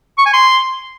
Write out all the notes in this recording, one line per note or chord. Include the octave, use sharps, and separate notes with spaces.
C#6
G#5
C6